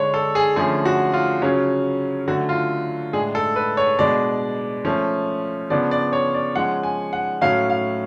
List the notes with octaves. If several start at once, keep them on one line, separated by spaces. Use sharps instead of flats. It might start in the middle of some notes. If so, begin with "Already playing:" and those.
Already playing: D3 G#3 D4 C#5
A4
G#4
D3 F3 A3 C#4 G#4
F#4
F4
C#3 F#3 C#4
D3 F#3 A3 F#4
F4
A2 G#3 D4 G#4
A4
B4
C#5
B2 G#3 D4 D5
F3 A3 C#4
C#3 F3 B3 D4 D5
D5
C#5
D5
F3 G#3 C#4 F#5
G#5
F#5
A2 F#3 A3 C#4 F5
F5